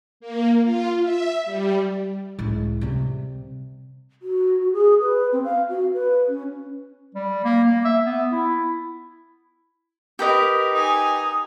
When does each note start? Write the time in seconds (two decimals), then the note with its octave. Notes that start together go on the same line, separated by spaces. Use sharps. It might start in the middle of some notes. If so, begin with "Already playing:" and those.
0.20 A#3
0.63 F4
1.02 E5
1.45 G3
2.39 C#2 A2
2.81 C3 G3
4.22 F#4
4.73 G#4
5.00 B4
5.33 C4
5.44 F5
5.69 F#4
5.93 B4
6.28 C#4
7.15 G3
7.44 A#3
7.64 A#3
7.85 E5
8.06 B3
8.32 E4
10.19 G4 A#4 B4 D#5
10.72 D#4 G#5 D#6